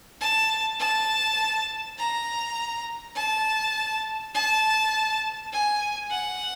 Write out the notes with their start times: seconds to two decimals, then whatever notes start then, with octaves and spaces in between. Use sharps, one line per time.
0.21 A5
0.80 A5
1.99 A#5
3.16 A5
4.35 A5
5.53 G#5
6.11 F#5